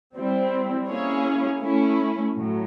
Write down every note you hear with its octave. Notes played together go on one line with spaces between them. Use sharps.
G3 C4 E4
A#3 C#4 E4 G#4 C#5
A3 C#4 E4
A2 F#3